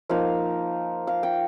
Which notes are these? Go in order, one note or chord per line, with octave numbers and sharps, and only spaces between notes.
F3 A#3 D#4 F5
F5
G5